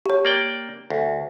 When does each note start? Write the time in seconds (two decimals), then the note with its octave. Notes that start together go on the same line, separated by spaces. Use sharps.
0.06 G4 C#5
0.25 A#3 D5 G5
0.90 D2